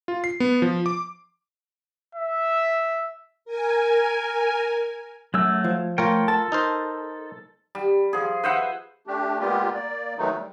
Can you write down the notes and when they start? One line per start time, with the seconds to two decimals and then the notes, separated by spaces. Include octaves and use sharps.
0.08 F4
0.24 C7
0.40 B3
0.62 F3
0.86 D6
2.15 E5
3.45 A#4 G#5
5.34 F#2 F#3 A3 E6
5.64 F3
5.98 A3 F4 A#4 C#5 G5
6.28 A4 A5
6.52 D#4 A#4 C5
7.75 G3
8.13 F3 G#4
8.44 B4 C5 E5 F#5
9.07 A3 D4 G4
9.40 G3 G#3 A#3 B3 F4 G4
9.74 A#3 D5
10.18 D#3 E3 F#3 G#3 A3 D#4
10.38 G3